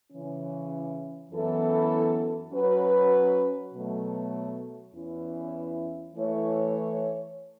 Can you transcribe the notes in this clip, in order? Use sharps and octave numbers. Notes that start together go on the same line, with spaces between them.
C#3 E3 C#4
F#2 E3 B3 E4 A4
F#3 C#4 F#4 B4
B2 F#3 A3
E2 E3 C#4 E4
E3 A3 E4 C#5